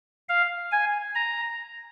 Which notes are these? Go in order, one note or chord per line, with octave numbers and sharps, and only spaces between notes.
F5
G#5
A#5